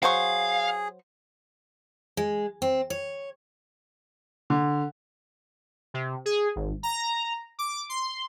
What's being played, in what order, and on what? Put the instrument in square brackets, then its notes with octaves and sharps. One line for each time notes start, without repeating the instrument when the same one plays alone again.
[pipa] F#3 C5 C#6 [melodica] G#4 [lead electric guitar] F5
[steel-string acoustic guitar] G#3
C4
C#5
[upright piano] D3
[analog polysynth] C3
G#4
G#1
A#5
D6
C6